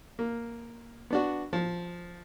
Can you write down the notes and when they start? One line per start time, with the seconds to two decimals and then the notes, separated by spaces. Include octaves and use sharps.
0.19 A#3
1.10 B3 D4 F#4
1.53 F3